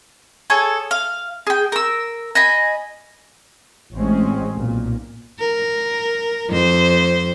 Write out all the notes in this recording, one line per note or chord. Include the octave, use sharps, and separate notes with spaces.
G#4 A4 C#5
F5
G#4 G5
A#4 E6
D#5 G#5 B5
A1 G#3 C4 C#4
B1 A#2
A#4
F2 C5